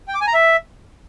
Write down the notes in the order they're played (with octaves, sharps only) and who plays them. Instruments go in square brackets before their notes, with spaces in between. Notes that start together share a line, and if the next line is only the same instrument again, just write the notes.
[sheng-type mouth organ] G5
D6
G#5
A#5
E5